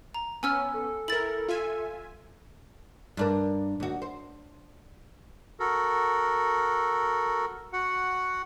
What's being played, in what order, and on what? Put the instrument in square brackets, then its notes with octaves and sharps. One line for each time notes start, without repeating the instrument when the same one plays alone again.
[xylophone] A#5
[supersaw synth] B3 C#4 [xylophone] G#5 E6 F6
[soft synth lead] A4
[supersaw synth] E4 A#4 [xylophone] A6 F#7
[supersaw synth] F4 E5 G#5
[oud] G2 D4 A#4
D#2 F#4
C5
[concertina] F#4 A4 A#4
F#4 F#5